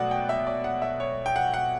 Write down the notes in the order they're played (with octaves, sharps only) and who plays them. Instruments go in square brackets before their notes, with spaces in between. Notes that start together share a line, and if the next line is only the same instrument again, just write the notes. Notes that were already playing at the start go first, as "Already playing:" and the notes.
Already playing: [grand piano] B2 F#3 A3 D5 F#5
G5
E5
D5
F#5
E5
C#5
G5
F#5
F#5